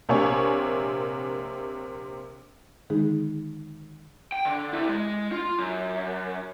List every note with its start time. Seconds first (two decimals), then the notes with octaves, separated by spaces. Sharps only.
0.09 A#1 C3 A#3 C#5 G#5 C#6
2.90 D3 D#3 G#3 D#4 G#4
4.32 G5
4.45 D3
4.73 C3 E4
4.89 G#3
5.32 F4
5.59 F#2